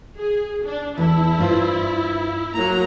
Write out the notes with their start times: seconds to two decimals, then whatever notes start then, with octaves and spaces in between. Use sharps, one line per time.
0.18 G#4
0.65 D4
0.98 E2 E4 A4
1.38 G2 F4 C5
2.54 F#3 A#3 A#5